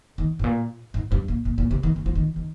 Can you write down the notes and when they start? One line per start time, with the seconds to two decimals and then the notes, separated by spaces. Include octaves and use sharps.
0.18 D#3
0.39 G#2
0.44 A#2
0.94 G#2
1.12 G2
1.28 A#2
1.45 A#2
1.58 A#2
1.71 C3
1.83 D#3
1.96 D#3
2.06 F3
2.15 D#3
2.36 D#3